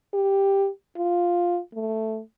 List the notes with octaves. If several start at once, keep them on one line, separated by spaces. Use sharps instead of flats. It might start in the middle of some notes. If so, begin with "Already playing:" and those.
G4
F4
A3